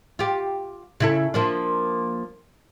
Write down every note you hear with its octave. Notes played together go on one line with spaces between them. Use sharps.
F4 G4
C#3 E4 A4
F3 A#3 D4